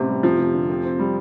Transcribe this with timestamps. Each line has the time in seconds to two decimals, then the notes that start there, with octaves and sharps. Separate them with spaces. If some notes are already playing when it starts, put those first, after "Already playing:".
Already playing: A1 C3 C4
0.08 G3
0.23 F1 F3
0.38 F1
0.54 D3
0.69 F2
0.85 C4
0.99 G3